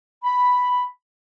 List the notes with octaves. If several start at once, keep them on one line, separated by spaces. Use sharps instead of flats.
B5